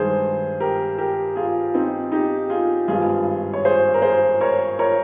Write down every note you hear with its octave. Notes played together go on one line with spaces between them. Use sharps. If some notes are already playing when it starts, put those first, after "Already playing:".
Already playing: G2 D#3 G#3 G#4 C5
G4 A#4
G4 A#4
F4 G#4
C4 D#4
D#4 G4
F4 G#4
G#1 G2 G3 F4 G#4
C#5
G#4 C5
A#4
G#4 C5
A#4 C#5
A#4 C#5